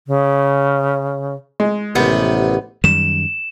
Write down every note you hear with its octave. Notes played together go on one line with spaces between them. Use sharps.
C#3
G#3
A1 C3 D#3 B3
F#2 D#3 G3 E7